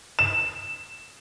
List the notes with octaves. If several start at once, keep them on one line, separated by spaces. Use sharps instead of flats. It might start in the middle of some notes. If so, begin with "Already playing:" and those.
E7